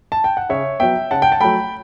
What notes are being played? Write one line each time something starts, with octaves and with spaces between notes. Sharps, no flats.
A5
G5
F#5
C#3 C#5 E5
F#3 B3 E5 G5
C#3 F#5 A5
G5
A5
F#3 A3 G5 B5